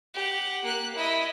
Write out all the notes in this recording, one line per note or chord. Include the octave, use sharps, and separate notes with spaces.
G4 F#5
A#3 F#6
E4 D#5